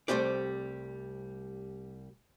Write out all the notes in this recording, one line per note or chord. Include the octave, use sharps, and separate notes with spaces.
C2 G3 A3 C4 G4 D5